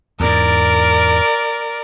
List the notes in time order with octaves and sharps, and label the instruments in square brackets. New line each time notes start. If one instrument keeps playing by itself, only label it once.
[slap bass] E2 G#2 [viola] A#4 D5